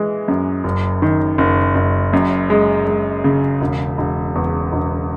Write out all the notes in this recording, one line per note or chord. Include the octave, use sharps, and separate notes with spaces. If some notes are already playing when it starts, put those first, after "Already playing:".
Already playing: E3 G#3
F#2
F#1
D#3
F#1
F#1
F#2
G#3
G#3
C#3
E1
E1
E2
E1